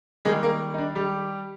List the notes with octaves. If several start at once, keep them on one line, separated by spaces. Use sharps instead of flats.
D#3 G3 G#3 A#3 G#4
A#3 A#4
D#4
D4
G3 G4